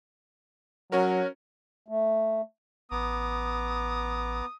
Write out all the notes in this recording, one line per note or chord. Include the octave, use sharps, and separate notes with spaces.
F#3 C#4 F#4 A#4 C#5
A3
A1 B3 A#5 D6 D#6